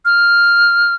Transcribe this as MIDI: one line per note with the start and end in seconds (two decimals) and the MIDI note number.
0.05 0.95 89